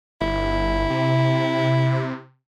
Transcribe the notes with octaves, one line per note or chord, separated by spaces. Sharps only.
G1 E4
C3